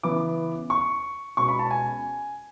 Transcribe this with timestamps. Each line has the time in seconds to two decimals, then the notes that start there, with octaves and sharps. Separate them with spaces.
0.03 C#3 E3 B3 D6
0.70 C#6
1.37 B2 G#3 C#4 C#6
1.49 B5
1.59 A5
1.71 G#5